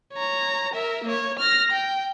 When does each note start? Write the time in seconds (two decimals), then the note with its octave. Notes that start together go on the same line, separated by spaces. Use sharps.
0.13 C#5 A#5
0.74 A#4 E5
1.05 A#3 C#5
1.39 F6 A#6
1.72 G5